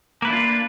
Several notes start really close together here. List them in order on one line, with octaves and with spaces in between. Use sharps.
A#3 B4 E4 D4 F4